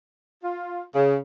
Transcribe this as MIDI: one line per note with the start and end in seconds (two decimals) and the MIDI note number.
0.42 0.82 65
0.94 1.15 49